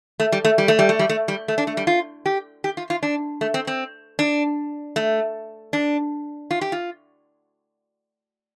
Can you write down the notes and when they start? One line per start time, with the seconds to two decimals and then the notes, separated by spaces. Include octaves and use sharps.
0.20 A3
0.32 G3
0.45 A3
0.58 G3
0.68 A3
0.79 G3
0.89 A3
0.99 G3
1.09 A3
1.28 G3
1.48 A3
1.58 D4
1.67 A3
1.77 G3
1.87 F4
2.26 G4
2.64 G4
2.77 F4
2.90 F4
3.03 D4
3.41 A3
3.54 C4
3.67 C4
4.19 D4
4.96 A3
5.73 D4
6.51 F4
6.61 G4
6.72 F4